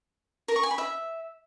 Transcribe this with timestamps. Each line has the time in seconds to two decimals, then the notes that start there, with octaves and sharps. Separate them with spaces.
0.48 A#4
0.56 C#6
0.63 G#5
0.71 B5
0.78 E5